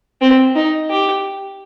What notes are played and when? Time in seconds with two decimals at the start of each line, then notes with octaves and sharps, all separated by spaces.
0.21 C4
0.55 D#4
0.90 G4